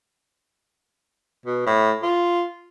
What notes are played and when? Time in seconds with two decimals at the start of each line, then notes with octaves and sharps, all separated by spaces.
1.46 B2
1.66 A2
2.03 F4